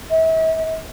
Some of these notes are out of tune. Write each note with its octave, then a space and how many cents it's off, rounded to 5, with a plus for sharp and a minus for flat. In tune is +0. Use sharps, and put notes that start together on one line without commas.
E5 -40